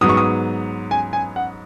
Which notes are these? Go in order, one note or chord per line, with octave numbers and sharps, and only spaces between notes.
G#2 F#3 B3 D#6
C#6
D#6
G#5
G#5
F#5